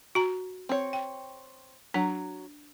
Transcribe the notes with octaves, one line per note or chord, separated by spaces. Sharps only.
F#4 A#5
C4 C#5
G5
F#3 D4